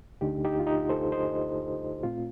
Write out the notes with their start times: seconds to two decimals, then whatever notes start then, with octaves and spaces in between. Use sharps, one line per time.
0.21 D2 D3 A3 D4 D#4 G4
0.45 D#4 G4
0.60 F4
0.66 D#4 G4
0.89 A4 C5
1.12 C5 D#5
2.03 A#2 A3 C4 F4